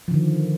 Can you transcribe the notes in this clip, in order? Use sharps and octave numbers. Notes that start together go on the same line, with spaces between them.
D3 D#3 F3